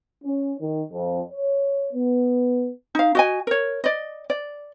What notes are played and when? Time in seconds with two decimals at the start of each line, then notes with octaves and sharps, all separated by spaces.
0.24 C#4
0.60 D#3
0.91 F2
1.32 C#5
1.93 B3
2.95 D#4 F5
3.15 F#4 D#5 G#5
3.47 A#4 C#5
3.84 D5 D#5
4.30 D5